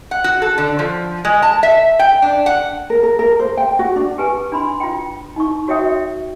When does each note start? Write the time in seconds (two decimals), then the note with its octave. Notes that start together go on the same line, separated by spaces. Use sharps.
0.11 F#5
0.24 F#4
0.42 A4
0.58 D3
0.79 F3
1.25 G#3
1.42 A5
1.63 E5
1.99 G5
2.22 D4
2.46 F#5
2.90 A#4
3.03 A#4
3.19 A#4
3.39 C5
3.57 G5
3.79 F#4
3.96 D4
4.18 G4 G#4 B4 G#5 A5
4.52 D4 B5 C6
4.80 F4 G5
5.36 D#4 C#6
5.68 F#4 C#5 E5 G5 D#6
5.84 E5